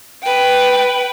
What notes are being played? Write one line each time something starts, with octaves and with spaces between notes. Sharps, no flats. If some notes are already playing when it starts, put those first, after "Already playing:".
B4 G5